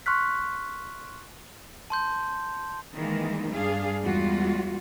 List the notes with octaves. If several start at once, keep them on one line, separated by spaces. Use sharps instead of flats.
C6 C#6 F6 F#6 B6
A5 C6 G6
D#3 E3 G#3 A#3
G2 D4 G#4 F5
E2 G3 G#3 F4 F#4